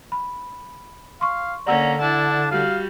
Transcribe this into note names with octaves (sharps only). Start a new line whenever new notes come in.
B5
F5 C6 C#6
D3 A#3 C#4 D5 F#5 A#5 E6
D4 E4 A5
G3 F#4 F5